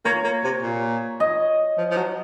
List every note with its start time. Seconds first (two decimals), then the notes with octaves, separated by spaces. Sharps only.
0.05 A#3 C#5
0.24 A#3
0.44 C3
0.62 A#2
1.20 D#5
1.78 F3
1.91 F3
1.97 F#3